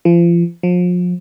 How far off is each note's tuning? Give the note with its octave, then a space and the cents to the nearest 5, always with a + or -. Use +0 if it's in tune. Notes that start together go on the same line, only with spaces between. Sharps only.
F3 -35
F3 +35